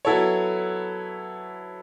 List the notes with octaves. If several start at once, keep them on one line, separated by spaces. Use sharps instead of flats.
F#3 B3 E4 A4 C#5